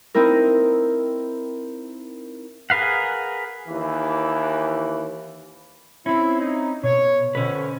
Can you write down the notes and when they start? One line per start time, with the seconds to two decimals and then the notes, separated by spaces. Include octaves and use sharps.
0.14 C4 D#4 E4 A#4
2.70 G#4 A#4 B4 F5 F#5
3.68 D#2 E3
6.06 C4 C#4 E4
6.40 D#4
6.83 B2 C#5
7.35 F2 D3 C#4 B4